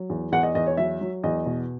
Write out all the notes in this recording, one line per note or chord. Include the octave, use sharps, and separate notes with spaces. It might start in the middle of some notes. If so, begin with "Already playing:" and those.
Already playing: F#3
E2
E2 F#5
D#5
E2 D#5
C#5
F#3 E5
F#3
E2 D#5
B2